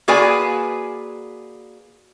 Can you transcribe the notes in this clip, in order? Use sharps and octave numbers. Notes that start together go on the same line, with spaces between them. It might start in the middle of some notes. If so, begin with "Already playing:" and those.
A#3 F#4 G#4 B4 D5 G#5